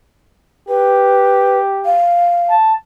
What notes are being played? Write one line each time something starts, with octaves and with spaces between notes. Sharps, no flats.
G4 B4
F5
A5